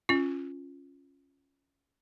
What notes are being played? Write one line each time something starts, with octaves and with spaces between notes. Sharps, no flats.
C#4 F4